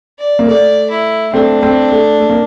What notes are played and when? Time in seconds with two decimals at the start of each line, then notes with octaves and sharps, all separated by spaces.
0.19 D5
0.39 A#3
0.48 A3 D5
0.91 E4
1.34 A3 C4 D4
1.62 A3 C4
1.92 A3
2.20 A3
2.30 A#3